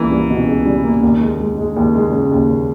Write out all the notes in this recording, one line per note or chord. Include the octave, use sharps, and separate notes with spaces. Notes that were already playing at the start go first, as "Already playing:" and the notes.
Already playing: C#2 E3 G3 A#3
G3
B2
C#2
G3
A#3
D#2
G#3
G#3
G#3
D#2
G#3
C#3
D#2